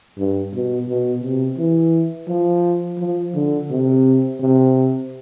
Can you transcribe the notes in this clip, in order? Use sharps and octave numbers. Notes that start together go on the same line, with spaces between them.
G2
B2
B2
C3
E3
F3
F3
D3
C3
C3